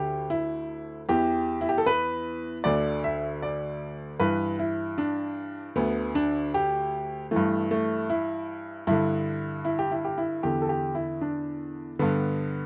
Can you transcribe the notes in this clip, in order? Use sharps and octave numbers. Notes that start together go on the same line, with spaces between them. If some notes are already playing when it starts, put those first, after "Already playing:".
Already playing: D2 D3 G4
E4
E2 E3 G4
E4
G4
A4
B4
D2 D3 D5
E5
D5
G2 E3 B4
E4
D4
D2 D3 B3
D4
G4
G2 E3 A3
A3
E4
G2 D3 E4
E4
G4
E4
G4
E4
E2 D3 G4
A4
G4
E4
D4
G2 D3 B3